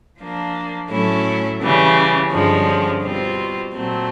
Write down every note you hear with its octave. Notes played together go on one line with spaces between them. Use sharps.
F3 A#3 D4
A2 F#3 A3 C#4 E4
C#3 E3 G3
G2 D3 F3 G#3 C#4
B2 G3 C4 F4
A#2 F#3 A3 C4